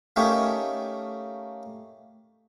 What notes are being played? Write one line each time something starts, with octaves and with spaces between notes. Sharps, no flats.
A3 A#3 C#4 D#4 G4 C#5